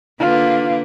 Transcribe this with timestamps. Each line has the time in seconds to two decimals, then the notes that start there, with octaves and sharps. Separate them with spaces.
0.20 D3 A#3 F4 B4